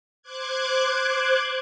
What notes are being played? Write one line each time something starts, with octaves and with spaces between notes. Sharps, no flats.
C5 D6 F#6 G#6